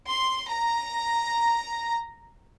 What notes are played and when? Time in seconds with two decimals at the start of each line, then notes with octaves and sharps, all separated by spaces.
0.09 C6
0.50 A#5